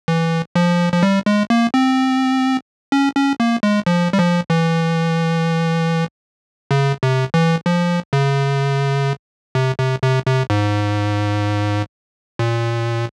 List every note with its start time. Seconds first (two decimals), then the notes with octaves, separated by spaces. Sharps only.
0.08 E3
0.56 F3
0.93 F3
1.03 G3
1.26 G#3
1.50 A#3
1.74 C4
2.92 C#4
3.16 C#4
3.40 A#3
3.63 G#3
3.86 F3
4.13 G3
4.18 F3
4.50 E3
6.71 C#3
7.03 C3
7.34 E3
7.66 F3
8.13 C#3
9.55 C3
9.79 C3
10.03 C3
10.26 C3
10.50 G#2
12.39 A#2